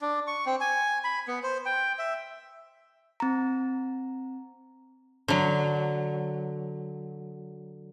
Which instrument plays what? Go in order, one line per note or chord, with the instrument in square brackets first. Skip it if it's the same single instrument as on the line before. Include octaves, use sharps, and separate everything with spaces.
[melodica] D4
C#6
C4
G#5
B5
B3
C5
G5
E5
[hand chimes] C4 A#5
[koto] D3 F#3